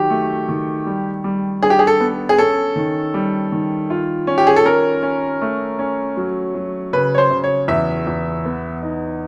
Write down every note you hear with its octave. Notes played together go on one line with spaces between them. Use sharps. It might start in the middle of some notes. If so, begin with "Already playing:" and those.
Already playing: D#3 F#3 G4
A3
D#3
G3
G3
D4 G#4
G4
G#4
A4
B3
G#4
C#4 A4
D#3
G3
D#3
F4
C#4
G4
G#4
A4
C#4 A#4
C#4
A3
C#4
F#3
F#3
C#3 B4
C#5
C5
C#3
C#5
E2 E5
E2
B3
D#4